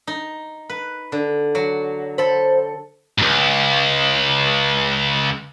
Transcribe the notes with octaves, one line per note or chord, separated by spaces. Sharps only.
D#4
B4
D3
F#3
A4 C5 B5
C#2 G#2